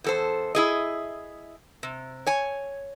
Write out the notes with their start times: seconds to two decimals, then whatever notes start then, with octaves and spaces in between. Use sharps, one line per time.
0.04 E2 A4 C5
0.55 E4 G#4 D#5
1.83 C3
2.27 C#5 G#5